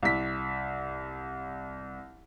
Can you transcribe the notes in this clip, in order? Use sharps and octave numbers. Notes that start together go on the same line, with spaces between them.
C2 B6